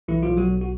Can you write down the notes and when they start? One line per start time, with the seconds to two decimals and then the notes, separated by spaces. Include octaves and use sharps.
0.08 B1 E3 E4
0.23 F3 F4
0.28 B1
0.37 F#3 F#4
0.47 B1
0.62 F#4